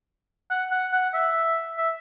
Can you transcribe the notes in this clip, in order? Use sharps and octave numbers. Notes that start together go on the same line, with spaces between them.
F#5
F#5
F#5
E5
E5